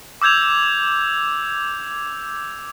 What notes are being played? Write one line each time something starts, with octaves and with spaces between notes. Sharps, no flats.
D6 E6 G6 G#6 F7